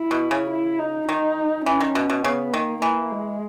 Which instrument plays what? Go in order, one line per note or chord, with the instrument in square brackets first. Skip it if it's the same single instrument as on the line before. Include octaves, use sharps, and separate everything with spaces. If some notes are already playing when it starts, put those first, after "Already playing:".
Already playing: [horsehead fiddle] E4
[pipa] B2
C#3
[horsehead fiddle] E4
D#4
[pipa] D#3 [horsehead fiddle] D#4
[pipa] E3 [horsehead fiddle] C#4
[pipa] D#3
B2
B2
[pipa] C#3 [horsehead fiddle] B3
[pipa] D#3 [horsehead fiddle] A#3
[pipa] E3 [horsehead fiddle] A#3
[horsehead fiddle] G#3